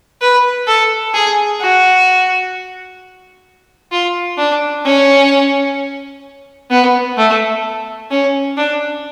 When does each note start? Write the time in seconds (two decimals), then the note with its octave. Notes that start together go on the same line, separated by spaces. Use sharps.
0.21 B4
0.68 A4
1.14 G#4
1.61 F#4
3.92 F4
4.38 D4
4.85 C#4
6.71 B3
7.18 A3
8.11 C#4
8.57 D4